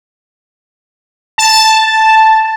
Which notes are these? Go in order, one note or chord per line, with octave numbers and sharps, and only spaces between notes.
A5